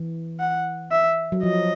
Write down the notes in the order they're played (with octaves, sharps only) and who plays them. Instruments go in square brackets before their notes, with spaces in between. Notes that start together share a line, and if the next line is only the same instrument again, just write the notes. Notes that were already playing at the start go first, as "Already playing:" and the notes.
Already playing: [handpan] E3
[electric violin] F#5
E5
[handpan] F#3
[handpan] F3 [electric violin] D#5